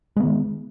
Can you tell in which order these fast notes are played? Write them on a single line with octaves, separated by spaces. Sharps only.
G#3 B3 D#3